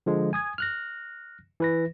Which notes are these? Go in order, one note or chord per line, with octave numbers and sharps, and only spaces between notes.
D3 F3 G#3
G#5 D#6 G#6
F6 F#6 A#6
E3 B4 A#6